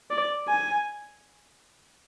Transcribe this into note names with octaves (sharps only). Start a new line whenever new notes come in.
D5
G#5